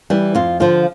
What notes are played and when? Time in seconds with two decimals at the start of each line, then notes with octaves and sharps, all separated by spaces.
0.10 E3 G3
0.35 F2 F4
0.60 D3 F3 F4